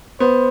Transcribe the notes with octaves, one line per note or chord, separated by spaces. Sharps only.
B3 C5